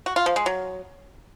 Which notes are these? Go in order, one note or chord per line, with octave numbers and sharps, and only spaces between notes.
F#4
F4
F3
G#3
F#3